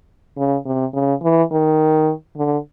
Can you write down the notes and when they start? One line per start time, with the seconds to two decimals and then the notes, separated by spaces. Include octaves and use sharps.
0.37 C#3
0.66 C3
0.94 C#3
1.23 E3
1.51 D#3
2.37 D3